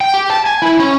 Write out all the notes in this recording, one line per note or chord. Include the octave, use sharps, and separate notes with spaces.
G5
G4
A5
G#5
E4
C#4